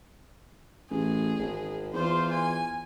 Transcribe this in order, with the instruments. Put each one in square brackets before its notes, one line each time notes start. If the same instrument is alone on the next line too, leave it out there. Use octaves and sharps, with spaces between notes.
[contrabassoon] A1 [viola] G#4
[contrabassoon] G#1
[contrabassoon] E2 [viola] F4 C5
[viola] G#5